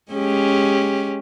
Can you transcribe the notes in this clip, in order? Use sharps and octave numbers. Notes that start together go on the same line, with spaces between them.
G#3 C#4 G4